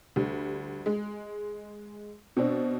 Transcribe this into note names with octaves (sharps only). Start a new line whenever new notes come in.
D2 G3
G#3
B2 C4 D4